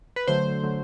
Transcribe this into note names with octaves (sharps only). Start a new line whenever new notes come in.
B4
D3 F#3 A3 C5
D3 F#3 A3